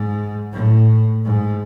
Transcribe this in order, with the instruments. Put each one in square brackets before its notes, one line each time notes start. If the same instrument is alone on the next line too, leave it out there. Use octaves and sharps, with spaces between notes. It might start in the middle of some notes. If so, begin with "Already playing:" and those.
Already playing: [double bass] G#2
A2
G#2